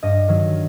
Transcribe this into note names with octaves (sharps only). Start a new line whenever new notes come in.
G2 D#5
D#3 F#3